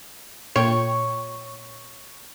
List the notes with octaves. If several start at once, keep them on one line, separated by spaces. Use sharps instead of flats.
A#2 F4 C#5 G5